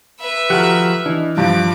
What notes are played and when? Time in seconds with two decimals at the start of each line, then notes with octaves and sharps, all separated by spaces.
0.21 B4 E5
0.50 F3 F#4 G4 A4 A#5 F6 F#6
1.06 E3 D4 D#5
1.37 G2 F3 G3 D6